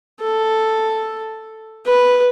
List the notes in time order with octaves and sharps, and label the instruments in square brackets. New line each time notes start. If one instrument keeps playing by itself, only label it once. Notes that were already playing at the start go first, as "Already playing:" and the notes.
[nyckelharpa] A4
B4